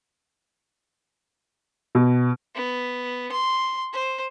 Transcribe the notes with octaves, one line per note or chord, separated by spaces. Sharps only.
B2
B3
C6
C5